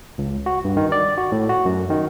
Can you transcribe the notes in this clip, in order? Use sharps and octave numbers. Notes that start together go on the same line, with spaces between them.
C#2
F#4
G2
D#3
D5
F#4
A2
F#4
F#2
D#3